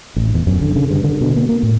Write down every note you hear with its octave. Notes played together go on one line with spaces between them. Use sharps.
A1
E2
F#2
D3
C#3
G2
D3
B2
A#3
A#3
A2